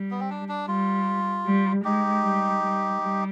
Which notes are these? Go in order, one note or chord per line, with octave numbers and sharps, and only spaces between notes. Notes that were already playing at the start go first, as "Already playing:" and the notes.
Already playing: G3
B3
C4
D4
D4
G3 F4
G3
G#3 D#4 G4
G3
G3
G3